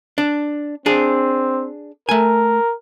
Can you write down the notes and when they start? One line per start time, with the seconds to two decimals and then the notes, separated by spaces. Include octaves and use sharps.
0.18 D4
0.86 C4 D4 G#4
2.09 A3 A#4 G#5